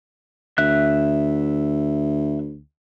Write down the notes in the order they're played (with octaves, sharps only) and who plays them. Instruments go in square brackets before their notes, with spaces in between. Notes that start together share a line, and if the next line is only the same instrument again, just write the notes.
[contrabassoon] D2 [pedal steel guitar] E5 F#6